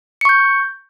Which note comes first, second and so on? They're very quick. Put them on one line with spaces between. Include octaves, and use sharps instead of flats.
C#7 C#6 G6